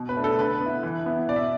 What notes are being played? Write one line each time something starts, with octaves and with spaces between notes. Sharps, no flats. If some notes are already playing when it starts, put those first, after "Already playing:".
Already playing: B2
B4
A3 D4
A4
D3 B4
B3
E4
E3
B3 E4
B2 D5
E5